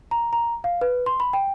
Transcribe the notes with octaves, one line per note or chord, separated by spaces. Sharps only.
A#5
A#5
F5
B4
C6
B5
G5